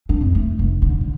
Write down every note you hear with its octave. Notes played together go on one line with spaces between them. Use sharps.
D4
F2
A3
F1
D3
D3